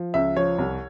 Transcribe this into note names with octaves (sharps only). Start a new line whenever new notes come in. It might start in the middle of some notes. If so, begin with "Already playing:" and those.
Already playing: F3
C#2 E5
F3 C#5
C2